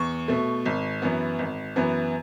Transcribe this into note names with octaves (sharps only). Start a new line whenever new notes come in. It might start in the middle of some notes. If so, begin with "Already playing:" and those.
Already playing: E2 C#6
B2 A3
G#1
F#2 E3 B3
G#1
F#2 E3 B3